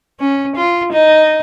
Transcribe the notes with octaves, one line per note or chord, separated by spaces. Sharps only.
C#4
F4
D#4